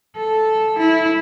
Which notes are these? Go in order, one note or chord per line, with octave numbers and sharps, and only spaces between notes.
A4
E4